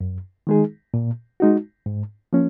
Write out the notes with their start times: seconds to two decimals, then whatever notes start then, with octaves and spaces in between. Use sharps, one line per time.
0.01 F#2
0.47 D#3 G#3 D#4 G#4
0.94 A#2
1.40 G#3 D#4 F#4
1.86 G#2
2.33 F3 A#3 C#4